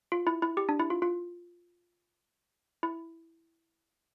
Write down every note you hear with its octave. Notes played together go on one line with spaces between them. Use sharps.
F4
E4
E4
G4
D4
E4
F4
F4
E4